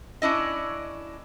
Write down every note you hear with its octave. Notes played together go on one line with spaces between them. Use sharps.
C#4 D4 E4 D#5